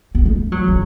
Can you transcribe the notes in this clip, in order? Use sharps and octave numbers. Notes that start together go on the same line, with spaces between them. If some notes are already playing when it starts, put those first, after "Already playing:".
B3
A3
F#3
D3